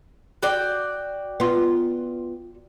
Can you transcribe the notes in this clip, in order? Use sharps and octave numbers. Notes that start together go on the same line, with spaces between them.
F#4 D5 G5
B3 F4